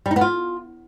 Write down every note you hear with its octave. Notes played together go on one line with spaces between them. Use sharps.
G3
D#4
B3
F4